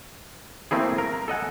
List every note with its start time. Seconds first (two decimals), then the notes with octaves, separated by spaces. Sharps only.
0.71 A3 A#3 C4 E4 G#4
0.98 A#4
1.28 A4 D#5 F#5 G#5